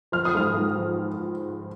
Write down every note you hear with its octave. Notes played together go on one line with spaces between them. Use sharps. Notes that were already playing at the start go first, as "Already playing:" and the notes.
F3 F6
D#6
G#2 F6
G#2
F3